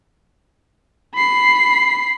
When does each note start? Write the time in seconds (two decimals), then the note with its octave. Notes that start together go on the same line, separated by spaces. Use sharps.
1.15 B5 C7